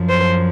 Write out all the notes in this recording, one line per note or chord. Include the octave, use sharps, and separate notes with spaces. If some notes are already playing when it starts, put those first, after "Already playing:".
Already playing: F#2 F3
C5